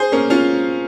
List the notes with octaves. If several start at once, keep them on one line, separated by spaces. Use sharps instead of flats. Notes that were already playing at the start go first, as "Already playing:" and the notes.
Already playing: G#4 C5
A#3 C#4
C#4 F4